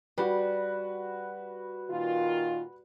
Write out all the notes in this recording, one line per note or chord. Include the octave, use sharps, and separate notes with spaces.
G3 F#4 B4
A#2 D#3 F4